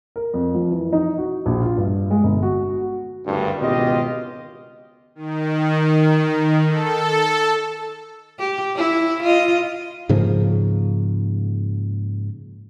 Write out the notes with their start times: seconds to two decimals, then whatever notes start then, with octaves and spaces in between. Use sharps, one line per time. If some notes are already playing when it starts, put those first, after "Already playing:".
0.16 A#4
0.34 F2
0.55 F3
0.71 E3
0.93 D#4
1.18 F#4
1.46 A#1
1.62 F4
1.77 G2
2.11 G#3
2.24 G1
2.43 F#4
3.26 F#1 D2 G2
3.60 G#1 C#2 B2 F4 G4 D#5
5.15 D#3
6.68 A4
8.39 G4
8.76 E4
9.23 F4 D#5
10.09 G#2 C#3 F3 A#3